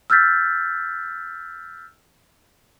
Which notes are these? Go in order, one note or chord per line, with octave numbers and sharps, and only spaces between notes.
E6 F6 G6 A6 B6